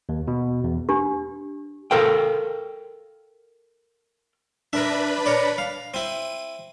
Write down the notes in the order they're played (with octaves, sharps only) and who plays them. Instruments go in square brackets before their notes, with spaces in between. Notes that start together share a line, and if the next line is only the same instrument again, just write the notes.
[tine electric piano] D#2
B2
E2
[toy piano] D4 G4
[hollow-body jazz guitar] A4 A#4 F5 G5
[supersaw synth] D4 B4 B5 [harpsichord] A#4 E5
[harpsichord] A#4 C#5 D5
F5
[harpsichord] C4 E4 [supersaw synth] D#7